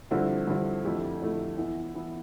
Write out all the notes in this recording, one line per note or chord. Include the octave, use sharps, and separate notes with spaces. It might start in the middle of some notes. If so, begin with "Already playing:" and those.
G2 D3 F3 C4 E4
G2 D3 F3 C4 E4
F2 D3 A3 E4 G4
F2 D3 A3 E4 G4
E3 B3 E4
E3 B3 E4